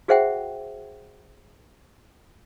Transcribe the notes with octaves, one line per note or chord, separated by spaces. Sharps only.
F#4 G#4 C5 E5 F#5 G5